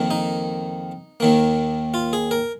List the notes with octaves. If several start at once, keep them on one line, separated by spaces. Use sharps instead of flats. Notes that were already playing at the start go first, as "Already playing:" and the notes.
Already playing: F2 D#3 A#3
D#4
D#2 D#3 A#3
F4
G#4
A#4